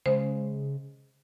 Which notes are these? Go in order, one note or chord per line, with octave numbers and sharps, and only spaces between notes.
C#3 G#3 C5